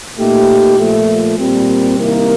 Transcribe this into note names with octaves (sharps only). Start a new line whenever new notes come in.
A#2 A3 D#4 G4
A#2 F3 A3
A#2 G3 C4
C2 C3 D#3 A#3